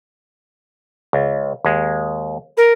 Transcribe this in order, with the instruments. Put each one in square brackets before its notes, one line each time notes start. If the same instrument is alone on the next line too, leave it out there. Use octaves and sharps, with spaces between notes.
[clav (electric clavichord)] C#2
D#2 G#3
[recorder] A#4